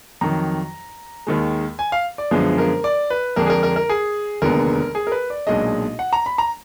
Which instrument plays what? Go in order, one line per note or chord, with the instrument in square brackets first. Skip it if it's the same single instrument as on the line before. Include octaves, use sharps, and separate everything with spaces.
[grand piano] F2 D#3 F#3 A#5
D#2 D#3 G#3
G#5
F5
D5
F#2 D3 F3 G#3 B3
A#4
D5
B4
F2 D3 G#3 D4 A#4
G#4
A#4
A#4
A#4
G#4
F1 D#2 D3 G#3 B3 A#4
G#4
A#4
B4
D5
B1 A#2 G#3 D4 D#5
F#5
A#5
B5
A#5